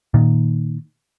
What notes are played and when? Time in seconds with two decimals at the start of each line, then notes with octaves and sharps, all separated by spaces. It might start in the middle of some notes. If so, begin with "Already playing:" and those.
0.14 A#2 D#3